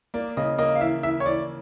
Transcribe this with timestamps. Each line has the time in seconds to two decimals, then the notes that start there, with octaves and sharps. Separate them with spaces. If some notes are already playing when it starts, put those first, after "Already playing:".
0.14 A#3 D5
0.37 C#3 D#5
0.58 A#3 D#5
0.75 F5
0.81 E3 E5
1.03 E3 E5
1.20 C#5
1.26 E3 D5